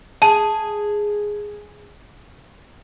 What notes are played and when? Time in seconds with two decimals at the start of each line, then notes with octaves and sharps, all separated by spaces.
0.22 G#4 A5